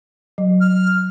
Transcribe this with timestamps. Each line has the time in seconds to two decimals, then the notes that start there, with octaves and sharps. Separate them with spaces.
0.38 F#3
0.61 F6